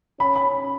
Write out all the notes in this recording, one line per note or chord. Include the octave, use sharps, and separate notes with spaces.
C#4 B5
B5